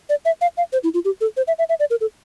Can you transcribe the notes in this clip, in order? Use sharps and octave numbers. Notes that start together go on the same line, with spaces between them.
D5
E5
F5
F5
C5
E4
F4
G4
A4
C5
E5
E5
E5
D5
A#4
A4